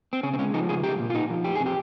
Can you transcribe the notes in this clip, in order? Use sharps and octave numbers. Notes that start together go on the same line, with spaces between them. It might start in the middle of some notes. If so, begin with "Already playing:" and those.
C4
C#3 C#4
C4
G#3 C#4
F3 D#4
C#3 G#4
F3 G4
A#2
F4
A#2 D#4
F3
F2 G4
C3 G#4
G4